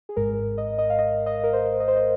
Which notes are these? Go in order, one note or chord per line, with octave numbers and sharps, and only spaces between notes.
G#4
G#1 G#2 G#3 A#4
D#5
D#5
F5
D#5
D#5
A#4
C5
D#5
C5
D#5